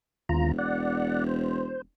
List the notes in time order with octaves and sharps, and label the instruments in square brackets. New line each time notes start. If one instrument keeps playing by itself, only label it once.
[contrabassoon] E1 [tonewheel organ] D#2 F4 A#5
[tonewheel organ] D5 F#5
C5